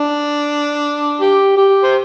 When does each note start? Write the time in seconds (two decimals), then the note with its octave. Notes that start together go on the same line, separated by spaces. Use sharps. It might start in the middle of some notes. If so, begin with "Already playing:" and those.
Already playing: D4
1.21 G4
1.57 G4
1.83 C5